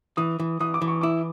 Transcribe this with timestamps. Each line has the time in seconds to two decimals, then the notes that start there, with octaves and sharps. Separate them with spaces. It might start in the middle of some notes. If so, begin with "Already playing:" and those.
0.17 E3 D#6
0.40 E3
0.60 E3 D#6
0.74 D6
0.82 E3
0.88 C#6
1.01 E4 D6